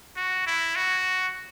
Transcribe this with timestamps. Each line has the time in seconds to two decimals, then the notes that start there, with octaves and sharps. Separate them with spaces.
0.17 F#4
0.47 E4
0.76 F#4